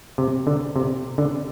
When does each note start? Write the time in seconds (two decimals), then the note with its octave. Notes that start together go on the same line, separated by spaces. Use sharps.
0.18 C3
0.47 D3
0.76 C3
1.18 D3